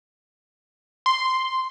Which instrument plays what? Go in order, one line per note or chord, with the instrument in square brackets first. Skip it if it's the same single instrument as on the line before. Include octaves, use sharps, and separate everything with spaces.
[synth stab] C6